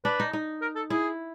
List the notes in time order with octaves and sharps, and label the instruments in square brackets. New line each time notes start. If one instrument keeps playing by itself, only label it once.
[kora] D4 [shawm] B4
[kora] D#4
D#4
[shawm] A#4
A4
[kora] E4 [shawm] G#4